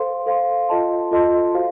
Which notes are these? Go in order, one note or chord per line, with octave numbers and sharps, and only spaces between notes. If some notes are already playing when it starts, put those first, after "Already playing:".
Already playing: A4 C5 F5 C6
A4 C5 F5 C6
F4 A4 D#5 A5 C6
F4 A4 D#5 A5 C6
F#4 C5 F5